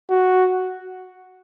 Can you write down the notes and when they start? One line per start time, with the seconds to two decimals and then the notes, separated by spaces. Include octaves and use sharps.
0.10 F#4